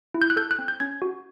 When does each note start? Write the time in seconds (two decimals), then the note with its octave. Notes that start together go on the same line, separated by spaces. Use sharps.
0.14 E4
0.22 G6
0.30 F#6
0.36 A4 G6
0.51 F#6
0.59 C4
0.68 G6
0.80 C#4 G#6
1.02 F#4